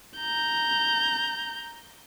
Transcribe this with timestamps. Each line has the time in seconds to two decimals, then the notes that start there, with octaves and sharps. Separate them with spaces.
0.17 A#5 G6